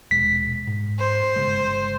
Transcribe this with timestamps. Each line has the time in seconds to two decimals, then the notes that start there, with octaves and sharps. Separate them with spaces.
0.11 D#1 B2 G#3 B6
0.67 G#2
0.99 C5
1.36 G1 C#3 G#3